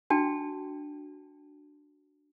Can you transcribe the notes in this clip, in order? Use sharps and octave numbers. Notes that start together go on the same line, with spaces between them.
D4 F#4 G5 A5